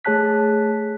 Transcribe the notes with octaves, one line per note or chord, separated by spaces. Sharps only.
A3 G#4 C#5 A5 F#6 B6